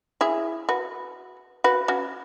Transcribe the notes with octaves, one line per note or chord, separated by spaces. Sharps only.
E4 G#4
F#4 B4
F#4 B4
C#4 F#4